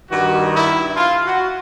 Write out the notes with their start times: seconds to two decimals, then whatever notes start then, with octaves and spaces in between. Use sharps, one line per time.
0.11 G2 D#3 G3 F#4
0.54 E4
0.97 F4
1.26 F#4